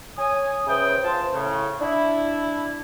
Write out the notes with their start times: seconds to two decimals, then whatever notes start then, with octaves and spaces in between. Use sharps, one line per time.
0.18 C#5 G#5 D#6
0.67 C#3 B4 C5 E5 G5 D#6
1.03 F4 C5 A5
1.32 A2 C#3
1.81 D4 E4